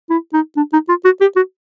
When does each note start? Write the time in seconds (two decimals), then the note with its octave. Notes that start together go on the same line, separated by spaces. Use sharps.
0.10 E4
0.33 D#4
0.57 D4
0.73 D#4
0.89 F4
1.05 F#4
1.21 G4
1.36 F#4